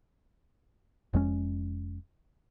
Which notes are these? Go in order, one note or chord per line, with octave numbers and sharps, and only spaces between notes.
F1 F2 G#3 C#4